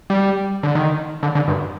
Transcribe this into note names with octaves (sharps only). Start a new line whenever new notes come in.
G3
D3
D#3
D3
D3
G2